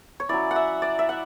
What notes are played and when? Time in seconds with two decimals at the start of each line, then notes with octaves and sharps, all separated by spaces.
0.20 C#5
0.29 F#3 C#4 E4 D5
0.51 F#5
0.56 E5
0.82 D5
0.99 E5
1.09 F#5